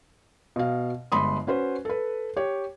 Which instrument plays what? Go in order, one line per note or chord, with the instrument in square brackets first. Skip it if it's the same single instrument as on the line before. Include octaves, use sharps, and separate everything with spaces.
[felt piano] B2 F5
G1 G#3 B5 C6 D#6
C#4 F#4 B4 C5
A4 B4
G4 C#5